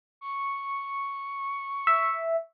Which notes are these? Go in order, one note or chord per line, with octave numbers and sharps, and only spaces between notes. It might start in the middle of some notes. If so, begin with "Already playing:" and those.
C#6
E5